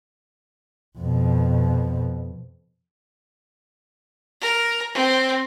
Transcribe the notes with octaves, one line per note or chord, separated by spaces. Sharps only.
F2 B2
A#4
C4